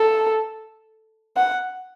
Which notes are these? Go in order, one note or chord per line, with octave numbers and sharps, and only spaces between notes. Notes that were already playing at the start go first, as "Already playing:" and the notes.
Already playing: A4
F#5